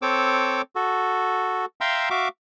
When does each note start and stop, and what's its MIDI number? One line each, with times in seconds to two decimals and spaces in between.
0.02 0.62 60
0.02 0.62 69
0.02 0.62 73
0.02 0.62 86
0.02 0.62 88
0.75 1.65 66
0.75 1.65 69
1.81 2.09 76
1.81 2.09 77
1.81 2.09 79
1.81 2.09 82
1.81 2.09 84
1.81 2.09 88
2.10 2.28 66
2.10 2.28 76
2.10 2.28 77
2.10 2.28 86